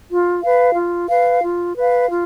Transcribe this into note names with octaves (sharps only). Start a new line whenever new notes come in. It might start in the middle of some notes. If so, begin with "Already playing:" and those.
F4
B4 F5
F4
B4 F5
F4
B4 F5
F4